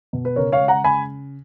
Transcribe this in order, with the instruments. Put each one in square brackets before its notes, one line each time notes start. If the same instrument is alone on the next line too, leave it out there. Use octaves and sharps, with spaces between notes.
[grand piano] B2
B4
C#3 A#4 C#5
C#5 F5
G#3
F#5 A#5
C#3 G#5 B5